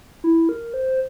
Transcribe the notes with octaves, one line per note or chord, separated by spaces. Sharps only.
E4
A#4
C5